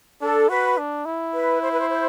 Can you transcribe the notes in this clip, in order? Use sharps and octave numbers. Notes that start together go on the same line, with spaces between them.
D4 A4
F#4 B4
D4
E4
B4
C5
B4
C5
C5